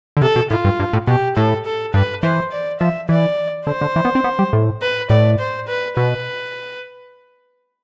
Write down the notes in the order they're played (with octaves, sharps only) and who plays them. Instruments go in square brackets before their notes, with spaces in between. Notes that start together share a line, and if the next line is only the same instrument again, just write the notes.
[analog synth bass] D3
[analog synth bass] C3 [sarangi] A4
[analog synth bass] B2
[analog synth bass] A2 [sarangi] F4
[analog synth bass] G2
G2
A2
[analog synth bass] B2 [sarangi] G4
[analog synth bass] A2 [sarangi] A4
[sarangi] A4
[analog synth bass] G2 [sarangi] B4
[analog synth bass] E3 [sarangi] C5
[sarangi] D5
[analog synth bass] F3 [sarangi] E5
[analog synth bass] E3 [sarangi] D5
[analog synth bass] D3 [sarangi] C5
[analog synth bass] D3
E3
B3
C4
B3
G3
A2
[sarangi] B4
[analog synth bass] A2 [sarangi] D5
[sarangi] C5
B4
[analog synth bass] B2 [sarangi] B4